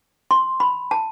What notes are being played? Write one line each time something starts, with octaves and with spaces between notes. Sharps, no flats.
C6
B5
A5